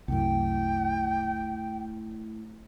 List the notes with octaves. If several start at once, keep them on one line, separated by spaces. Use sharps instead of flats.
C2 F#2 A3 E4 G5